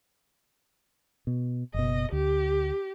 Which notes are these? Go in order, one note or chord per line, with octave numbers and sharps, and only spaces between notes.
B2
F#1 B2 D#5
D2 G4